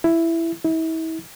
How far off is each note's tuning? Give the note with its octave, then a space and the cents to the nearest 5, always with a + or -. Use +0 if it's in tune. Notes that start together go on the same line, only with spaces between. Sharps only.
E4 +10
E4 -35